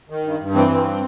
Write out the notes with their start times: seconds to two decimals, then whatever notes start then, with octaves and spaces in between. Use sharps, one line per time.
0.10 D#3
0.24 G2
0.39 G2
0.54 E3 C4
0.69 G2